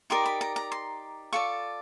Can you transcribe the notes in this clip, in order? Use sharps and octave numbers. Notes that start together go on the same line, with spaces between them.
D#4 G4 A#4 D5 C6
B5
A#5
A#5
C6
F4 A4 D5 C#6